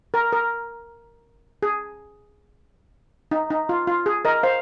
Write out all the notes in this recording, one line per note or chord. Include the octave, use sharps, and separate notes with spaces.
A#4
A#4
G#4
D#4
D#4
F4
F4
G#4
A#4 D#5
C5 F5